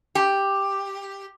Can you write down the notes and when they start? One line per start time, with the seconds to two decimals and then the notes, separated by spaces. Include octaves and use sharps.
0.15 G4